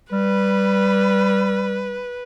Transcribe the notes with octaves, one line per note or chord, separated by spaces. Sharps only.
G3 B4